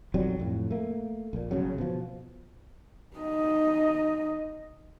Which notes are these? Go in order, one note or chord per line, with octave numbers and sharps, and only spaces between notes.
B1 F2 F#3 G3
F2 A2
A3 A#3
A#1 A#2
G1 D2 C#3 F#3
B2 F3
D#4 D#5